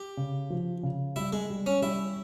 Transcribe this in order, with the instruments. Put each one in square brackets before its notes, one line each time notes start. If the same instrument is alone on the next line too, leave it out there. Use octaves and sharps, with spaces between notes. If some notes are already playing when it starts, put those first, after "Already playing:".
Already playing: [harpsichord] G4
[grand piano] C#3
F3
C#3
[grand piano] G3 [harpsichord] E4
[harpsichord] G#3
[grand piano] G3
[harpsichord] C#4
[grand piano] G3 [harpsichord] E4